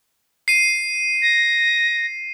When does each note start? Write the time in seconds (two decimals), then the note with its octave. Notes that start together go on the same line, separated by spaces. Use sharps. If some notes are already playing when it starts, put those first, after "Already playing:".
0.48 C7 D#7
1.22 A#6